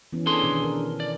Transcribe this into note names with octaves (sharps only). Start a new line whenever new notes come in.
E3 B3 C#4
C#4 D4 G#4 A4 C6
B2 D#3
A#4
D5